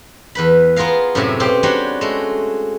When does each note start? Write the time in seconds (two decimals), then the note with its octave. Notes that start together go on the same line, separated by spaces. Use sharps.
0.35 E2 B4 B5
0.76 B3 F4 G#4 A#4 F5
1.15 F#2 A2 C3 G#4 E5
1.40 B2 C4 G4 F5
1.63 G3 C#4 D4 F#4 C5 C#5
2.01 G#3 A3